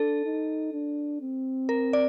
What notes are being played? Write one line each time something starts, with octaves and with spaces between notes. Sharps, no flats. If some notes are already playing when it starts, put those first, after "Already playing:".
Already playing: D4 A4
D#4
D4
C4
A#4
D5